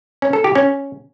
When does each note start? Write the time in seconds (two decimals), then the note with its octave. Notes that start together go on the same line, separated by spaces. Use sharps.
0.22 C#4
0.33 A4
0.44 G4
0.55 C#4